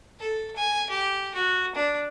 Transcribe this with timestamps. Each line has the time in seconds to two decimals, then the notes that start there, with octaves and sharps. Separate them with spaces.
0.19 A4
0.56 G#5
0.90 G4
1.34 F#4
1.75 D4